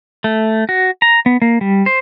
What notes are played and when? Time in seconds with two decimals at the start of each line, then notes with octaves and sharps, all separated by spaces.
0.24 A3
0.69 F#4
1.02 A#5
1.26 B3
1.42 A#3
1.61 G3
1.86 C5